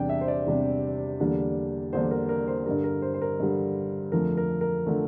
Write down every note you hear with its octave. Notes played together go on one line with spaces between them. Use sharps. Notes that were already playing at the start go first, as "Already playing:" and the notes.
Already playing: E2 C3 G3 D4 G5
E5
C5
D5
E2 C3 G3 D4
E2 D3 G3 A#3 D4
E2 D3 G3 A#3 D4 C5
A#4
A#4
C5
G2 D3 G3 A#4
A#4
C5
C5
A#4
G2 D3 G3
F2 D3 F3 A3 A#4
A#4
A#4
D3 F3 A3